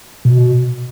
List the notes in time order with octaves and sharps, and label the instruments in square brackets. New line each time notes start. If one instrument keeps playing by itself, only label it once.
[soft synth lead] B2